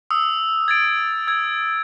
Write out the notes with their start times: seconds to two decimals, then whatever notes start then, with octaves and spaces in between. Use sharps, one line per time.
0.11 D#6 E6
0.68 G#6 A6 D7
1.27 E6 G#6